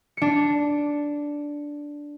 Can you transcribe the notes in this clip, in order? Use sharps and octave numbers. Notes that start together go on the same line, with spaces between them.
D4 C#7